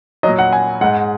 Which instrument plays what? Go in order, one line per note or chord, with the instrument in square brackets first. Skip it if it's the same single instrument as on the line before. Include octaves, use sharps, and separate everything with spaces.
[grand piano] A#2 F#3 D#5
F#5
G#5
G#2 G#3 F#5